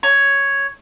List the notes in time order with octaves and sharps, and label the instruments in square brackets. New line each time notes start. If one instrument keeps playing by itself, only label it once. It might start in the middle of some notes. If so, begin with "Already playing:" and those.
[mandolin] C#5